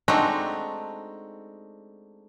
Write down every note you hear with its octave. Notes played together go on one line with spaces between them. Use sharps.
G#3 A3 C4 D4 D#4 F#4